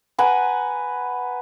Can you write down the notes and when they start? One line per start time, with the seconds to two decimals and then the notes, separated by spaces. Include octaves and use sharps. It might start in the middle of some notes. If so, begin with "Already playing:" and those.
0.18 B4 F#5 G#5 A#5